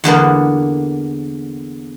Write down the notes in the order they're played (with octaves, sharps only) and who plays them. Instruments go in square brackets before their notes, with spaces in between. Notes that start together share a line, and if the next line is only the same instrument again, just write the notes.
[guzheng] E2 D3 A#3 B3